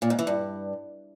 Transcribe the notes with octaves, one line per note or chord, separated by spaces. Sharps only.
A#2
G#2
E3
G2